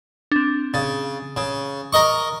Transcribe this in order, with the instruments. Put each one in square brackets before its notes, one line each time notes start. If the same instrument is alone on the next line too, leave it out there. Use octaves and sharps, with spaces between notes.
[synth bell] C4 D4
[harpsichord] C#3 [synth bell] A6
[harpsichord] C#3
A#4 D#5 C#6